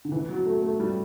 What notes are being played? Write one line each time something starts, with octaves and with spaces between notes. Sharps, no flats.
D3
E3
F#3
A3
A3
G3